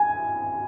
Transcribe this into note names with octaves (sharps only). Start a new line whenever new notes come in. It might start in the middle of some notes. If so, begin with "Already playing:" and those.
Already playing: G#5